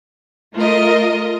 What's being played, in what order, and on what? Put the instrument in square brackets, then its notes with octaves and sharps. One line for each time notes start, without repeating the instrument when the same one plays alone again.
[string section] A3 F4 A#4 D#5